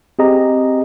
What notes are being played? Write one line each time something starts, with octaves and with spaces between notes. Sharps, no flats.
C4 G4 G#4 D#5 A#5